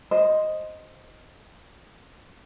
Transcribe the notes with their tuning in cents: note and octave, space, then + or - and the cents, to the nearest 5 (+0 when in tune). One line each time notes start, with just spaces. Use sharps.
C5 +0 D#5 +0